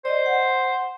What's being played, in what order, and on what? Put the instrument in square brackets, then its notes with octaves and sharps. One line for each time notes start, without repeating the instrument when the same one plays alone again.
[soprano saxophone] C5 [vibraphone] D5 D#5
[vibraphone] F#5